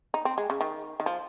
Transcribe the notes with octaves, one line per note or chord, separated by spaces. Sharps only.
D#4
C4
G#3
C#3
D#3
D#3
F3